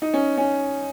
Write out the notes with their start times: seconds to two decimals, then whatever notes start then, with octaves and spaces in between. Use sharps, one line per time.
0.02 D#4
0.14 C#4
0.38 C#4